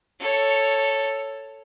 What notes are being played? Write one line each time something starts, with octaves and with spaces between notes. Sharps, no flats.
A4 C#5